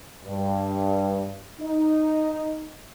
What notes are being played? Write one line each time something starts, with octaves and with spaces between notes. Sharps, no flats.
G2
D#4